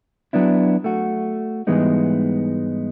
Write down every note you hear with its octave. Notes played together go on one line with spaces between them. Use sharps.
F#3 B3 D4 E4
A3 F#4
G#2 E3 G3 G#3 B3 D#4